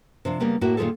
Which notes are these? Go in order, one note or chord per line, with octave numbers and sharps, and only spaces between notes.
C3 F3 D4
C#3 G3 A#3 B3
A2 A#3 E4 F#4
A#2 D#3 E3 F4 G#4 A4